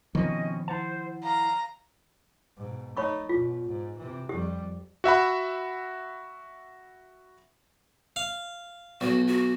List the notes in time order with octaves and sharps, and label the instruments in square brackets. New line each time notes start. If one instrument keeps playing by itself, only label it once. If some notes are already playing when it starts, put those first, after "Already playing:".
[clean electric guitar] B2 C4 C#4 [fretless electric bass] D#3 F3 [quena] D#5
[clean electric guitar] E4 F#5 A5 [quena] C5
[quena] F5 [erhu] A#5
[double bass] G#2 B2
[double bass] A3 D#4 [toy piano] C#5 B5 C#6
[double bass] E2 B2 [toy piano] F4
[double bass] G#2
C3 E3
[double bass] F2 G3 [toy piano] G4
[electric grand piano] F#4 E5 F#5 B5
[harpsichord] F5
[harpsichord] B1 [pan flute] F#4
[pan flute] F#4